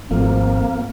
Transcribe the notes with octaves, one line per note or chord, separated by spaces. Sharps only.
G#1 G#2 F3 A3 A#3 C4